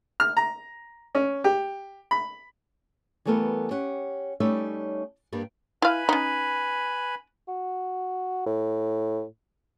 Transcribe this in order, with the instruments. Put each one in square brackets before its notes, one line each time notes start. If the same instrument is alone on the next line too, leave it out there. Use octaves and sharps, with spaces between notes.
[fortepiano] F6
A#5
C#4
G4
B5
[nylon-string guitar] E3 G3 A3 B3 A4 A#4
C#4 G4 F#5
G3 A3 C#4 D#4 C#5 E5
G2 G3 A#3
[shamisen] E4 F5 [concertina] B4 G#5 B5
[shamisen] C#4 D#4
[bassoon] F#4
A2